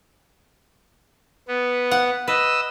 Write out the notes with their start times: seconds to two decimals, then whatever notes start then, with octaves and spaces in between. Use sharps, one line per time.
1.48 B3
1.91 F#5
2.28 B4 D#5 E6